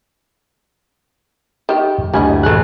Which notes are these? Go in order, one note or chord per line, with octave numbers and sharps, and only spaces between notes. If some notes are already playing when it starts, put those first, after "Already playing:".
D#3 G4
F#2 A#3
D2 G3 E4 D#5 G#5
A1 E4 G#4 A4 F#6